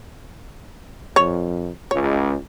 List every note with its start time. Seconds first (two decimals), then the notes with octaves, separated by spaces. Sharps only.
1.16 F2 C#5
1.91 C#2 C#5